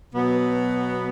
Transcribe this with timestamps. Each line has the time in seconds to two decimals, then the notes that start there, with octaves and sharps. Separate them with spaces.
0.13 B2 F#3 B3